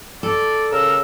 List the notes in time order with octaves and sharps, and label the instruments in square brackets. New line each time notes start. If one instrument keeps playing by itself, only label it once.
[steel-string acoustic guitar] A4 [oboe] D5
[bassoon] C#3 [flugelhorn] A#4 [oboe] E6